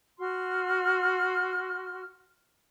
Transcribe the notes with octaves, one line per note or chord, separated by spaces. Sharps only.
F#4 C6 F6